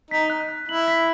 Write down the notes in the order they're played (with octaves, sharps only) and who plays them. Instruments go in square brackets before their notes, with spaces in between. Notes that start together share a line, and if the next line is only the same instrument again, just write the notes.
[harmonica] D#4 [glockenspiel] B6
[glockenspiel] F#6
F#6
[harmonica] E4 [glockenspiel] F#7
[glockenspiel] B6